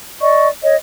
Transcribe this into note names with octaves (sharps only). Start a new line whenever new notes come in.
D5 D#5 C#6
C#5 D#5